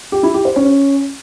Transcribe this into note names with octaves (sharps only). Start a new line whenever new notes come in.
G4
E4
G4
C5
C#4